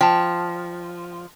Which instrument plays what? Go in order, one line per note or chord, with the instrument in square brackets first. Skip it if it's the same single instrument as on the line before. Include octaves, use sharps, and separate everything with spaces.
[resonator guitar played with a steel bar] F3 [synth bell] G5 A5